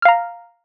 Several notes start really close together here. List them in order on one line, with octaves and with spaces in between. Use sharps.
F6 F5 A#5